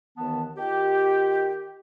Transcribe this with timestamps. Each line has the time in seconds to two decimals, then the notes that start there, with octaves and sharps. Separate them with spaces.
0.17 D#2 D#3 E3 B3 A5
0.57 D#3 F4 G4